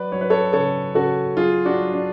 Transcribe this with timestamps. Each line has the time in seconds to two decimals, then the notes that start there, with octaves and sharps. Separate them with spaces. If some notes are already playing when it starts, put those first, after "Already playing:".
Already playing: F#3 B4 D5
0.12 F#3 C#5
0.21 B4
0.30 A4 C#5
0.53 C#3 A4 C#5
0.95 C#3 F#4 A4
1.37 F#3 F4 G#4
1.65 D4 F#4
1.79 F#3
1.93 D4